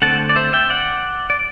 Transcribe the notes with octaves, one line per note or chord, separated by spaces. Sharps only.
D3 A3 C4 F#5 A5
D5
C5 E5
E5 G5
D5 F#5
D5